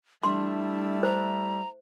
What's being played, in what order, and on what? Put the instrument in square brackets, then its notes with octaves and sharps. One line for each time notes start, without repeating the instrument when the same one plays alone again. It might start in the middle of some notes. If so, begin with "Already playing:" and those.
[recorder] G3 [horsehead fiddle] A3 E4 [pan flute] D4 [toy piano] C6
[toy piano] C5 [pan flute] A#5